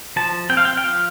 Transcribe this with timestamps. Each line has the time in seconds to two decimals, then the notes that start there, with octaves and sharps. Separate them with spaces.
0.16 F3 A5
0.49 C4 G5
0.57 F5
0.65 G5
0.77 G5
0.84 F3 F5